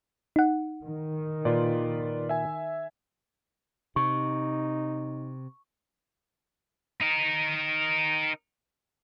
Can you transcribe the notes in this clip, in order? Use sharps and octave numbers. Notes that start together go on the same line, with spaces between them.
D#4 F#5
D#3
A#2 F4 B4 D5
E5 G#5
C3 D#4 C#6
D#4 A#4